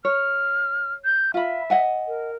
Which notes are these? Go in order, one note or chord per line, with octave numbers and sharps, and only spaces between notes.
C#5 F6
G6
F4 E5 B5
D#5 F#5 G#5
A#4